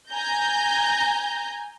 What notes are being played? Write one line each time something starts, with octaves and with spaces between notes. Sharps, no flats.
G#5 A#5 G6